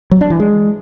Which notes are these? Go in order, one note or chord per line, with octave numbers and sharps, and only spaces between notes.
F#3
D4
E3
G#3